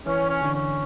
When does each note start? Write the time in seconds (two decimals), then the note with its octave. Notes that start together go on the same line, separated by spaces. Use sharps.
0.06 E3 C#4
0.29 C#4
0.42 D3
0.53 C#4